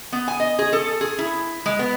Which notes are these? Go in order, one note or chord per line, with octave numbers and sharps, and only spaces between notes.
B3
G#5
D#5
G#4
A4
G#4
E4
G#3
B3